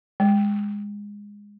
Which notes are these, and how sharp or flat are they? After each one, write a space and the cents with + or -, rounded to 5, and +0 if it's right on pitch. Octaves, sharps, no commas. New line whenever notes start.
G#3 -15